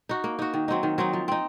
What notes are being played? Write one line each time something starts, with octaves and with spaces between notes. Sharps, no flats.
D#4 F#4
A#3
D#4 F#4
D#3
F#3 C4 D#4
D#3
F#3 C4 D#4
F3
C4 D#4